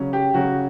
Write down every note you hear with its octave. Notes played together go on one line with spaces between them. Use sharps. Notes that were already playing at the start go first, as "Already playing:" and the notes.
Already playing: C#3 F#3 C#4
G4
C#3 F#3 C#4 F#4